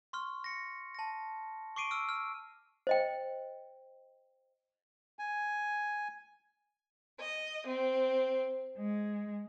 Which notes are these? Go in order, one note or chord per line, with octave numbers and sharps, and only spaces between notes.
C6 C#6 F6
A#6 C#7
A5 A#6
C#6 D6 C7 D7 D#7
E6 F6 D7
F6
C5 D#5 G5
G#5
D#5
C4
G#3